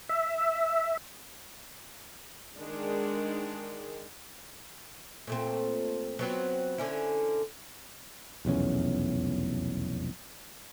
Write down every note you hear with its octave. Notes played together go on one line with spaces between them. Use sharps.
E5
D#3 G#3 D4
A#2 A3 C4
F#3 B3 C4
D3 C#4 E4
F1 B1 E2 C#4